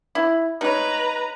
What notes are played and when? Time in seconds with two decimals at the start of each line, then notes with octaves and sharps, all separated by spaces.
0.15 E4
0.61 D#4 B4 C#5 A#5